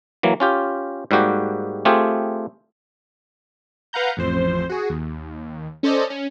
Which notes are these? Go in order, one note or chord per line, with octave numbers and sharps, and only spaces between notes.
E3 F#3 A#3
C#4 F4 G4
G#2 G3 A#3 F#4 G4
A3 C4 F4 G4 G#4
B4 F5 F#5 A#5 G6
A1 F2 C5
F#4 G#4
D#2
C#4 A4 C5 D5 D#5
C#4